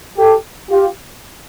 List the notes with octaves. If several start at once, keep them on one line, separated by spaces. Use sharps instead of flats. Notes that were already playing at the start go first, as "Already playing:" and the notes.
G4 A4
F4 G4